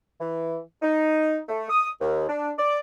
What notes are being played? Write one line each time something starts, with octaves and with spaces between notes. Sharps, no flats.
E3
D#4
A3
D#6
D#2
D4
D5